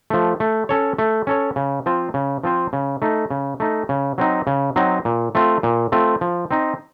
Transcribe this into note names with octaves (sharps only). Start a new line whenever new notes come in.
F3 A3
A3
C#4 A4 C#5
A3
C#4 A4 C#5
C#3
F3 C4 F4 C5
C#3
F3 C4 F4 C5
C#3
A3 D#4
C#3
A3 D#4
C#3
F#3 C4 D#4
C#3
F#3 C4 D#4
A#2
A3 C4 F4
A#2
A3 C4 F4
F3
C4 D#4